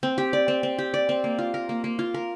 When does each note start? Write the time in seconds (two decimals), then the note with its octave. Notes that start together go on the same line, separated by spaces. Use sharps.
0.03 C4
0.18 G4
0.33 D5
0.48 C4
0.63 C4
0.79 G4
0.94 D5
1.09 C4
1.24 A#3
1.38 F4
1.54 A#4
1.69 A#3
1.84 A#3
1.99 F4
2.14 A#4